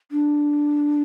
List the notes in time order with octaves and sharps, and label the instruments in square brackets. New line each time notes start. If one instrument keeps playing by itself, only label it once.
[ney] D4